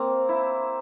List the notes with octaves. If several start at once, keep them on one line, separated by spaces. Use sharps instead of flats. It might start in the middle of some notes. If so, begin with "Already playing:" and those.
Already playing: A#3 C4
E4